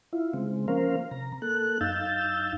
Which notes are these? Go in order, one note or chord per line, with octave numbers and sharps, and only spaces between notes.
E4 F4
C#3 G#3 C4
F3 A#3 C#4 A#4 C5 F5
C3 A#5
A#3 A4 F#6
F#2 D#4 F5 E6 G6 A6